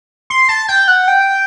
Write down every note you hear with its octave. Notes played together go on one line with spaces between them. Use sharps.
C6
A5
G5
F#5
G5